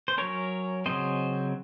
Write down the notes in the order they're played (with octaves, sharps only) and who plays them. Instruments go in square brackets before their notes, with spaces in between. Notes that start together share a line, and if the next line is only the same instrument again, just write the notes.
[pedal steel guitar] C5
F#3 C#4 A#4 C#5
C#3 F#3 C4 C5 D#5